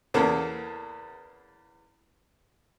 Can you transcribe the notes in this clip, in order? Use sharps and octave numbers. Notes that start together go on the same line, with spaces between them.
E2 C#3 A#3 B3 A4